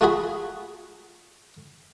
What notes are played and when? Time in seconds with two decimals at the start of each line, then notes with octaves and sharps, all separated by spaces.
0.01 A3 F4 F#4 G#4 B5